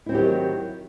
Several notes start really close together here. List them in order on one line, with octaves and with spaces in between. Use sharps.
E4 C4 F#3 G4 D#3